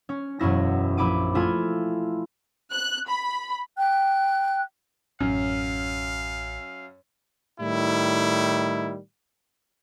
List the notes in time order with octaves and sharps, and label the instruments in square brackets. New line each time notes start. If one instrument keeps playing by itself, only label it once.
[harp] C#4
E1 F#2 C#4 E4 A#6
A#1 E4 B5 D6 D#7
A3 E4 F4 G#5
[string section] F#6
B5
[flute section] G5 F#6
[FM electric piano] A1 C#4 F6 [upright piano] F#2 [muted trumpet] F5
[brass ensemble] A2 D#3 G3 E4